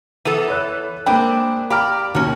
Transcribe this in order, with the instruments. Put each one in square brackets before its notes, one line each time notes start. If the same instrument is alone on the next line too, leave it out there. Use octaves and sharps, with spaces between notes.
[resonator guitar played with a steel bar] E3 B3 A4 [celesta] D#7
[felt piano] B4 C#5 F#6
[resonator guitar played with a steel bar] G#3 C4 D4 [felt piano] A#3 B5 [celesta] G5
[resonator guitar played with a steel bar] G4 D5 [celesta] F5 F6 [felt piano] A#5 B5
[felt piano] D#2 A#5 [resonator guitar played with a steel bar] C#4 F#4